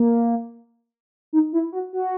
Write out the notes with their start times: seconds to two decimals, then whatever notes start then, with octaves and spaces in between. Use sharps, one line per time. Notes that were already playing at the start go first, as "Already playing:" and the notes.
Already playing: A#3
1.33 D#4
1.53 E4
1.73 F#4
1.93 F#4